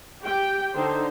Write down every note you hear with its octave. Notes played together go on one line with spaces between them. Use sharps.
G4 G5
D3 D#4 C5